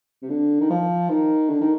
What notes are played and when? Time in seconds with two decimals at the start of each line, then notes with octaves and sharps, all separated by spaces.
0.22 C3
0.30 D3
0.60 D#3
0.70 F3
1.09 D#3
1.49 D3
1.61 D#3